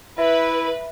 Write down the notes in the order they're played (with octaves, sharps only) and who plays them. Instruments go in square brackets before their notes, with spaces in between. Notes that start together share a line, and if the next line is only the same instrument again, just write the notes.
[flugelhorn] E4 [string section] B4 [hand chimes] E5